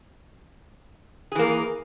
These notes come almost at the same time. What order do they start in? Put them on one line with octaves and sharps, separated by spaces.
G#4 E3 A#3